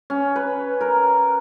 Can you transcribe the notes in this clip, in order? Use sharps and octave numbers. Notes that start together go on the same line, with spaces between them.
C#4
B4
A#4